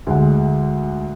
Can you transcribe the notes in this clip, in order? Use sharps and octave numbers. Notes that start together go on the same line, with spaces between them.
D2 G#3 F#5